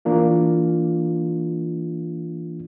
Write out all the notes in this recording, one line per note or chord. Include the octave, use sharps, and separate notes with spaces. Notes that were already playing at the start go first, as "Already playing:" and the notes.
E3 A#3 D4 F4